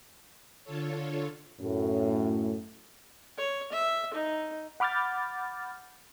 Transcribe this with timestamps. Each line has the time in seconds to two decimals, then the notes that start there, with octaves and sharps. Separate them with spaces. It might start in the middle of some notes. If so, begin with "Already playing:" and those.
0.64 D3 F4 A4 C#5
1.61 F#2 A2
3.38 C#5
3.73 E5
4.14 D#4
4.80 F#5 B5 D6 F6 G6 A6